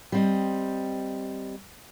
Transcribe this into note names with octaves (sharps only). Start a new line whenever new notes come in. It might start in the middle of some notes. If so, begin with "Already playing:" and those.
G3 C4 D#5